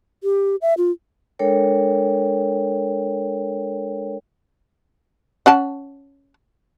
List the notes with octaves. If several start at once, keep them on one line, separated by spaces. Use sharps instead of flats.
G4
E5
F4
G#3 D4 A4 A#4 C#5 G5
C#4 F#5 A5